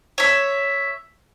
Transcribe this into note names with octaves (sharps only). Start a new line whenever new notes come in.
C#5 E5